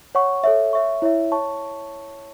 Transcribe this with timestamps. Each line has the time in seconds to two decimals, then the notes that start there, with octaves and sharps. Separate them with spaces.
0.15 C#5 F#5 C#6
0.44 A4 C#5 E5
0.73 C#5 E5 C#6
1.02 E4 C#5 E5
1.32 C#5 A5 C#6